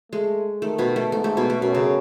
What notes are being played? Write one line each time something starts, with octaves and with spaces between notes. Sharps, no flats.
G#3 A3
D#3 A3
B2 B3
A3
G#2 A3
A3
B2 B3
A3
F#2 B2
C#3